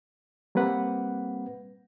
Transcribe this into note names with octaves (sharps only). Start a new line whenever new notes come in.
G3 A#3 C4 B4 F#5